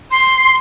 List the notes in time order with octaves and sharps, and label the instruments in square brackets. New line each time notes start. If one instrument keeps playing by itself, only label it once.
[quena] C6